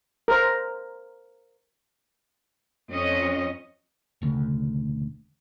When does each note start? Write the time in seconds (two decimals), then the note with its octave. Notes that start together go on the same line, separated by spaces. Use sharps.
0.28 A#4 C5
2.91 F2 C#4 D#5
4.22 E1 D2 C#3 A3